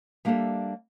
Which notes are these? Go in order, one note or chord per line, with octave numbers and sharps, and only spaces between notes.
G3 A#3 D4 G4 A4 E5